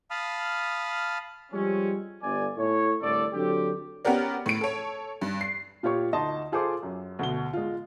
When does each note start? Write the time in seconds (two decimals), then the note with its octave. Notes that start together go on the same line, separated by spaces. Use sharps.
0.11 F5 A5 B5 D#6 F6
1.52 F3 G3 G#3 C4 C#4
2.21 G1 D5 G#5
2.57 A2 C#5
3.01 C2 A2 D3 A4 D5
3.33 D3 F#3 C4 G4
4.05 B3 C#4 F#4 G4 A#4 D5
4.46 A2 D7
4.61 A4 C#5
5.21 G2
5.41 C7
5.83 A#2 F4 G4 C#5 C#6
6.13 D2 D#4 D#5 A5 C6
6.52 F4 G#4 A4 C5 C6 D6
6.83 F#2
7.19 D2 B2 G7
7.53 G#3 F4